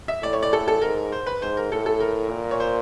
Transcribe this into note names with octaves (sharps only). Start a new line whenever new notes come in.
E5
A2 D5
C#5
D5
A4
A4
G#2 A#4
C5
B4
G#2 C5
A#4
A2 A4
A4
A#4
A#2
C#5
C5